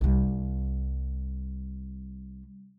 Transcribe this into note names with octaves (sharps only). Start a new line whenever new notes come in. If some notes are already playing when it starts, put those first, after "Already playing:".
C2 G3